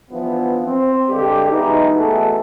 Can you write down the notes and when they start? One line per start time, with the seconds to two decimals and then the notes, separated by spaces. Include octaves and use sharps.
0.11 G2 E3 F3 B3
0.64 C4
1.09 G2 D3 G#3 G4
1.50 B2 E3 G#3 D#4
1.96 B2 E3 A3 F#4 G#4 A4